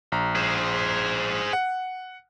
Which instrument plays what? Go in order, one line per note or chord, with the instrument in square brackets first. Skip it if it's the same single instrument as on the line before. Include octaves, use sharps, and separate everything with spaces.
[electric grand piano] A#1 A#5
[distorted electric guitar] G#4 C5
[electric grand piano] F#5